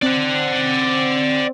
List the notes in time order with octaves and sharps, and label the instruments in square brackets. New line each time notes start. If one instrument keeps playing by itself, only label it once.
[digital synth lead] C4 [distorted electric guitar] D5 F#5